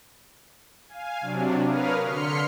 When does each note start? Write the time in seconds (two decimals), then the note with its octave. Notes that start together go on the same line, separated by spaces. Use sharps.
0.88 F5 G#5
1.21 C3 F#3 D4
1.64 A#4 B4 C#5 F5 D#6 F6
2.03 D3 C6 F6 B6 C#7